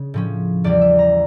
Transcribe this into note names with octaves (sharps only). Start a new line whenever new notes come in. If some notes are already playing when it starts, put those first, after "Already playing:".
Already playing: C#3
A2 F3 C#4
E2 E3 G3 D5
E5
A#5